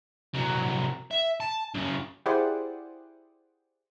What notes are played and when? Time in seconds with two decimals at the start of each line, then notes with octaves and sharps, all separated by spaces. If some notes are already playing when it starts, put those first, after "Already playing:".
0.34 C2 F#3
1.11 E5
1.40 A5
1.75 F#2 C#3
2.26 E4 G4 G#4 C5 D5 F#5